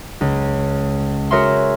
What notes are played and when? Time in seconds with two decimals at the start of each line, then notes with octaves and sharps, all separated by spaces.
0.21 C#2
1.31 F#4 G#4 A#4 C#5 E5 C6